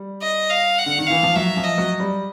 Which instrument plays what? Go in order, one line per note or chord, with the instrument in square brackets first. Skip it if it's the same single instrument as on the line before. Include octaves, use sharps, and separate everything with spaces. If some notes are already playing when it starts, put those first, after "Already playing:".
Already playing: [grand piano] G3
[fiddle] D#5
F5
F#5
[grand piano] D3
D#3
[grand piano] E3 [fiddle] F5
[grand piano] F3
[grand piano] F#3 [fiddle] E5
[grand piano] F3
[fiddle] D#5
[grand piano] F#3
G3